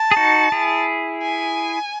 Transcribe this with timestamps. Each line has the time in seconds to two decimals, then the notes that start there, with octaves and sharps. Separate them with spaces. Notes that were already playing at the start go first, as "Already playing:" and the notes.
Already playing: A5
0.11 G#4
0.17 D#4 F#4
0.52 E4 G#4
1.23 G#5